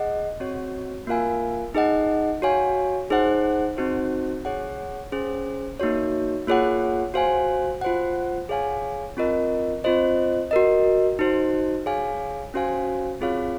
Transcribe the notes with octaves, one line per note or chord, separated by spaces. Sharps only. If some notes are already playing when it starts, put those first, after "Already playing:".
Already playing: G#4 D#5 F#5
C4 F#4 C#5
A#3 F4 A#4 F5 G#5
D#4 G#4 D#5 F#5
F#4 C#5 F5 G#5
D#4 G#4 C5 F#5
C4 D#4 F#4 C5
G#4 C#5 F#5
C#4 G#4 C5
A#3 D#4 F#4 C#5
A#3 F4 G#4 C#5 F#5
F#4 C5 F5 G#5
F4 C5 F#5
G#4 C#5 F5 G#5
C4 F4 A#4 D#5
C4 F4 C5 D#5
F#4 A#4 D#5
D#4 F#4 C5
G#4 C#5 F5 G#5
C#4 F#4 C5 F5 G#5
C4 F4 G#4 C#5 F5